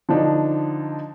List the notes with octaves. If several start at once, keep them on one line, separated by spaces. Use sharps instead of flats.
D3 F3 D4 D#4